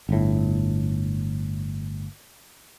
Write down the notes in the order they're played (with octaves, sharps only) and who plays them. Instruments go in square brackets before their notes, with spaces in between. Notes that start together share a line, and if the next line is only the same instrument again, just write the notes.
[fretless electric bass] G1 A2